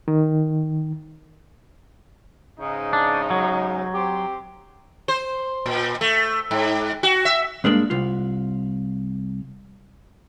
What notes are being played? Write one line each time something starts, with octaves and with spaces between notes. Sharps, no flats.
D#3
G#2 C#3 D#4
D4
F#3
C4 G4 C6
C5
A#2
A3
G#2
F#4
E5
G2 G#3 A#3 D4
C2 F4